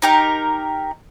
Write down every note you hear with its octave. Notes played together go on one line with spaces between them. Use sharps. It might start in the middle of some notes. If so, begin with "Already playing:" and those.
D#4 G4 A#4